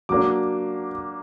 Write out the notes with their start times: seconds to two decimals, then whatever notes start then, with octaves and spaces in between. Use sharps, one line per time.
0.09 F#3 A#3 D4 D6